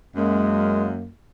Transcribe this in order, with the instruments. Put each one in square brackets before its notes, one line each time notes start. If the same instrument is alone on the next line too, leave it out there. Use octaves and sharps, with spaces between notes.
[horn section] F#2 A#3 [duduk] G#3